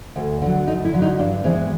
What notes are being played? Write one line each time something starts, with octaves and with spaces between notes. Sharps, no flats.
D2
D3 F#3
D2 D#4
E4
D3 F#3
D#4
G2 D4
E3 G#3 B3 C4